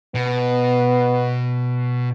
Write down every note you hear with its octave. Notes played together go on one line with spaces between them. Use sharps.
B2 B3